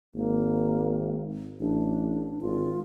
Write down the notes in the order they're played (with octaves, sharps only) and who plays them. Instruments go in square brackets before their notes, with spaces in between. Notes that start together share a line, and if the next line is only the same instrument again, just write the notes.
[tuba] G#1 [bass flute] A#3
[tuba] A1 [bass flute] D4
[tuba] G#1 [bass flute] F4